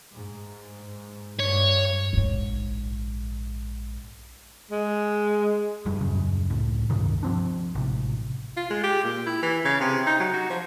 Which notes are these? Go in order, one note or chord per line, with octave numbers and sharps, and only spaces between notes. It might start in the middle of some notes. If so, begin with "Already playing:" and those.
G#2
G2 C#5
A#1 G#2
G#3
F1 G2 G3
D#1 F#2 C#3
C#2 A2
C#2 G2 C3 D#3
F3 C4 D4
A1 C3
F4
G#3
G4
A#2
E4
E3
C#3
C3
D#4
F#3
F#4
F3